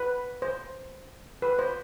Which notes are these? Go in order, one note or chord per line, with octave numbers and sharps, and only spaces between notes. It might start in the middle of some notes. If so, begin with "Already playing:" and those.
Already playing: B4
C5
B4
C5